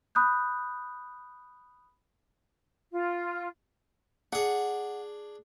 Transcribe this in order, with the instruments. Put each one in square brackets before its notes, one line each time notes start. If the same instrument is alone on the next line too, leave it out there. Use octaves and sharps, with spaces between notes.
[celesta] B5 D#6 F#6 G6
[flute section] F4
[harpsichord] D4 G#4 [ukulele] F#5